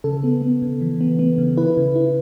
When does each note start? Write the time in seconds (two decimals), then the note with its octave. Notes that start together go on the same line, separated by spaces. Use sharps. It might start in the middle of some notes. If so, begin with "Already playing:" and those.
0.04 C#3 A4
0.24 B3
0.42 B3
0.62 C#3
0.81 E3
1.01 B3
1.19 B3
1.38 C#3
1.57 E4 B4
1.77 C#3
1.95 E4